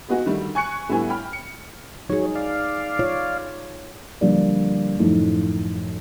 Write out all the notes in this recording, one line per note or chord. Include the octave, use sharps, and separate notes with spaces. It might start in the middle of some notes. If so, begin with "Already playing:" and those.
G#3 B3 D#4 F#4 G#4
D3 D#3 G3 A3
G#5 C#6 F#6 C#7
A2 D3 G3 B3 G#5
G5 B5 F6
C#7
F#3 D#4 G#4 C#5
D5 F5
F4 C#5
D3 F3 G3 A#3 D5
F#2 A2 D#3 F3 A3 D#4